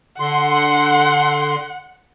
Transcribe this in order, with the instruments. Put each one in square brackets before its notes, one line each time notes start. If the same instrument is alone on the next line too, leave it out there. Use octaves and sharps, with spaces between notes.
[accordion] D3 C6 [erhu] F#5